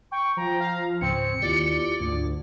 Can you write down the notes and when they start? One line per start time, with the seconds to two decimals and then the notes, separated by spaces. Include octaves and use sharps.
0.12 G5 C#6
0.37 F3 A#5
0.60 F5
1.01 C#2 G#2 C#3 C4 C#7
1.42 D#2 E4 F4 G4 D5
2.00 D2 G#2 F4